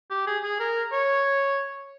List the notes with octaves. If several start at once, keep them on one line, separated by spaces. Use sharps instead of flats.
G4
G#4
G#4
A#4
C#5